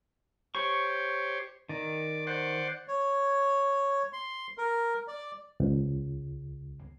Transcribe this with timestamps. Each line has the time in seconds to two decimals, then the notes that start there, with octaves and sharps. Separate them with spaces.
0.55 G4 C5 C#5 C#6
1.69 D#3 D5
2.27 C5 D5 F#5
2.88 C#5
4.13 C6
4.58 A#4
5.08 D5
5.60 C#2